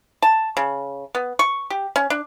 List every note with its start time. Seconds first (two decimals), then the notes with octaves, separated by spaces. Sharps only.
0.22 A5
0.57 C#3
1.15 B3
1.39 C#6
1.70 G4
1.96 C#4
2.10 D4